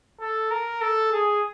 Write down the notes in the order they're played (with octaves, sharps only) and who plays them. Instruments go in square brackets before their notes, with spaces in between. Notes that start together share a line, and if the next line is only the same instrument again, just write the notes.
[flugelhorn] A4
A#4
A4
G#4